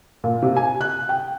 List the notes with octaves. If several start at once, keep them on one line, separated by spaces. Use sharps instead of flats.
A#2
C3
G#5
F#6
G5